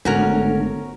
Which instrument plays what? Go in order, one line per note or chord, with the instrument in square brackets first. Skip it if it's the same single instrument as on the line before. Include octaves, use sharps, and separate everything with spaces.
[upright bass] G#1 B3 [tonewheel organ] D3 A3 [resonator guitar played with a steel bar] C#4 F#4 A#4